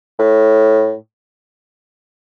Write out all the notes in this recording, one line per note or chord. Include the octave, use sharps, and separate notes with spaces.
A2